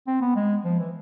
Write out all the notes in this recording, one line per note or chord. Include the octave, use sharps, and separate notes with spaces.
C4
B3
G#3
F3
E3